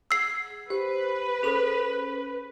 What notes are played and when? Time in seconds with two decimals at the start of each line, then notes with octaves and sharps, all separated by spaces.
0.11 G#4 F#5 E6 C7
0.70 G4 B4 C5
1.43 C#4 G#4 A4 C5 B5